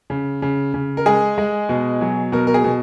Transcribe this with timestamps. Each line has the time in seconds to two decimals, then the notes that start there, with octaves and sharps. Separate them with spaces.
0.10 C#3
0.42 C#3
0.74 C#3
0.97 A#4
1.06 G#3 G#4
1.38 G#3
1.69 B2
2.01 F#3
2.32 B2 A#4
2.47 A#4
2.54 G#4
2.64 B2